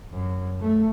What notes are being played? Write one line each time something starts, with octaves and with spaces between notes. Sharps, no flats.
F#2
A3